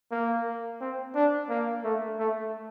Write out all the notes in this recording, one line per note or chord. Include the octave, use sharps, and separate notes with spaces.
A#3
C4
D4
A#3
A3
A3